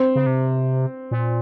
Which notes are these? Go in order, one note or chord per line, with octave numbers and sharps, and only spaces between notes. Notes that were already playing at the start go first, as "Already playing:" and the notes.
Already playing: C4
C#3
C3
A#2